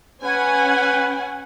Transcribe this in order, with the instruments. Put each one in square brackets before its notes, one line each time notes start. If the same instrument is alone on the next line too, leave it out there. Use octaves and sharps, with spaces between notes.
[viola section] C#4 F#5 G#5 [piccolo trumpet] B4